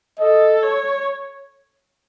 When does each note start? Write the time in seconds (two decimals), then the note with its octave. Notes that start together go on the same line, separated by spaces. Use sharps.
0.20 A4 D#5
0.62 C#5